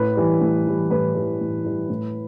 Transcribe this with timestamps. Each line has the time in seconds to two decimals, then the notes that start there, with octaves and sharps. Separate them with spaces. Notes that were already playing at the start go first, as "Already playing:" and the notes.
Already playing: A2 B4
0.17 E3 G3
0.41 A2
0.66 E3 G3
0.90 A2 B4
1.15 E3 G3
1.41 A2
1.64 E3 G3
1.89 A2